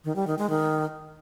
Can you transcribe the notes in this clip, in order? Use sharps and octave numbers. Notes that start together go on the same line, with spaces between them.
D#3
G3
D#3
G#3
D#3